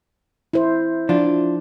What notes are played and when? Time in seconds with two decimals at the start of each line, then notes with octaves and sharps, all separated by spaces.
0.53 E4 C5
1.09 F3 D4 F4